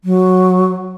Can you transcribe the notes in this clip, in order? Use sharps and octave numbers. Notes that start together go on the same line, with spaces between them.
F#3